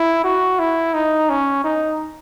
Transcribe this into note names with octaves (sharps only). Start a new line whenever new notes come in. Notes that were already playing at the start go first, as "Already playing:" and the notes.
Already playing: E4
F#4
E4
D#4
C#4
D#4